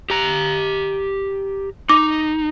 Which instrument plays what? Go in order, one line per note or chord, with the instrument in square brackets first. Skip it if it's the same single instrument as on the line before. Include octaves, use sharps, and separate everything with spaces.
[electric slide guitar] G4 A#5
[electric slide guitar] D#4 [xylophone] D6